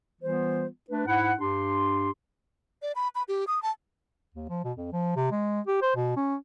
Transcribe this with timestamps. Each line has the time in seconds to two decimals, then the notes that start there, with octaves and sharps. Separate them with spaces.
0.22 E3 G3 B3 F4 C5
0.90 A3 D4 B4
1.06 G#2 E4 F#5
1.40 G2 D4 G4 C6
2.82 D5
2.96 B5
3.15 B5
3.28 G4
3.47 D#6
3.62 A5
4.35 D#2
4.49 F3
4.64 B2
4.77 F2
4.93 F3
5.16 C3
5.32 G#3
5.67 G4
5.82 C5
5.96 B2
6.16 C#4